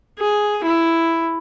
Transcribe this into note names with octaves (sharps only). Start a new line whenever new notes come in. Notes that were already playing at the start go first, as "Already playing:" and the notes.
G#4
E4